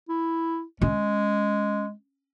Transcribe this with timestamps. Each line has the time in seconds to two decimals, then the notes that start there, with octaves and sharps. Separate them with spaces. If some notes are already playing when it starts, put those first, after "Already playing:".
0.09 E4
0.81 G#3 C#4